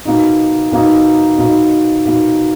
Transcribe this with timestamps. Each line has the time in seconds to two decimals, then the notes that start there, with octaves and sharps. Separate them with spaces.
0.05 B2 A#3 D#4
0.72 B2 A#3 D#4
1.38 B2 A#3 D#4
2.05 B2 A#3 D#4